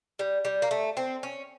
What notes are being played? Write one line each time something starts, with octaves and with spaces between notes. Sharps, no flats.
G3
G3
A#3
A3
C4
C#4